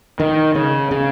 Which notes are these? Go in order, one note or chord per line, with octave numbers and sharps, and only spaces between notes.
D#3
C#3
C#3